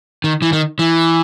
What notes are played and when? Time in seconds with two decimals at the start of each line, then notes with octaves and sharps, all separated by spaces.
0.24 D#3
0.42 E3
0.53 D#3
0.79 E3